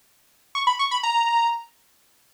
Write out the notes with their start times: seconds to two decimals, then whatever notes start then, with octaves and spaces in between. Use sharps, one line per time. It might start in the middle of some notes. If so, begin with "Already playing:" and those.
0.55 C#6
0.67 B5
0.79 C#6
0.91 B5
1.03 A#5